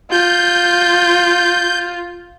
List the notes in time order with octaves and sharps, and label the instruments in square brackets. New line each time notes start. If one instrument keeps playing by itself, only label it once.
[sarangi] F4 [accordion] G6